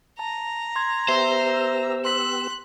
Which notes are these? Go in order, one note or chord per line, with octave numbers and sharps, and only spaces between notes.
A5 A#5
C6 G#6
B3 G4 C5 E5 E6
C6 F#6 B6